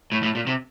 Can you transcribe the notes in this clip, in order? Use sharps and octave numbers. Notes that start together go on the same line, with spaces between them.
A2
A2
A#2
C3